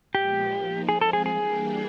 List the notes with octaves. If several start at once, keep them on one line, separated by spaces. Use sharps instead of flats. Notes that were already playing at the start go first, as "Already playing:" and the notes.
A#2 F3 G#3 B3 G4
F3 A#3 D#4
F3 G#3 C4 F4 G#4
A4
G#4
E3 G3 A#3 D4 G4 G#4